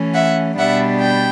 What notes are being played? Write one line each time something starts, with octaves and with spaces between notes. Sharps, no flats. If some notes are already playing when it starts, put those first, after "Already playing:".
Already playing: E3 A3 C#4
E5 F#5
B2 G3 B3 D4 E5 F#5
G5